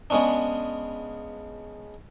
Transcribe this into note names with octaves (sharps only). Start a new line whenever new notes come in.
C#3 G#3 B3 C#4 D4